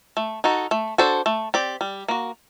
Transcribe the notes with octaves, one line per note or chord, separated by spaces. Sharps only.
A3
D#4 F#4 A4
A3
D4 F#4 A4 C5
A3
C4 G4 D5
G3
A#3 F#4